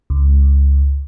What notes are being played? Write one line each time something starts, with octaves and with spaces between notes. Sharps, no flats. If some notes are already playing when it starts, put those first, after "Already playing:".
C#2